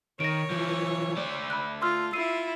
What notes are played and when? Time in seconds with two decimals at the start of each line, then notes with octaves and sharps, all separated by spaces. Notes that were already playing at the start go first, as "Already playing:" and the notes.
0.20 D#3 C#5 A#6 D7
0.50 E3 F3
1.17 A3 D5
1.50 B5 F#6
1.82 F4 C6 E6 F6
2.13 E4 F4 E6 C7 D#7